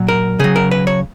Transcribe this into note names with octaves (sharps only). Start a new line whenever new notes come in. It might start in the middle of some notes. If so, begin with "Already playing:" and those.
Already playing: A#2 F#3
A#4
C#3 F#3 G#4
A#4
B4
C#5